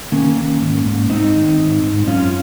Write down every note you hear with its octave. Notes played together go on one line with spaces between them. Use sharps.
D#3 A#3 C#4
D#3
G#2
G#2
G#2 C4 D#4
D#3
G#2
G#2
F#2 C#4 F4